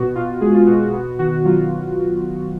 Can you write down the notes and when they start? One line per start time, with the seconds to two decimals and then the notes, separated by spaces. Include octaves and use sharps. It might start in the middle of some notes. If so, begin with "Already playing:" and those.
Already playing: B2 B3 F#4
0.15 B2 F4
0.41 G#3 G#4
0.55 F4
0.67 B2 F#4
0.80 F#4
0.93 B3 F#4
1.19 D#3 F#4
1.45 F#3 F4